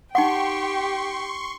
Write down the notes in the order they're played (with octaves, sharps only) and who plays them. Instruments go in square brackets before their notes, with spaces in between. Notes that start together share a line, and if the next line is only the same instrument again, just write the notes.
[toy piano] D#4 F#5 [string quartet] G4 G5 [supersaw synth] C6 C#6